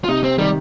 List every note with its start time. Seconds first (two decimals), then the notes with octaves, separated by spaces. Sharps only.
0.04 F4
0.08 C3 D#4
0.24 C4
0.38 D#3 G3